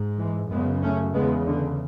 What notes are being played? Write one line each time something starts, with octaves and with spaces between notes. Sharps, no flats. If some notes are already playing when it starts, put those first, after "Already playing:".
Already playing: G#2
E3 G#3
F#2 C#3 G#3 B3
A3 C#4
E2 C#3 G#3 B3
D3